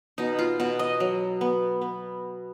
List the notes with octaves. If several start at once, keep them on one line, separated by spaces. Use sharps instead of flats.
B2 D#4
F4
B2 F#4
D#5
F#3
B3
B3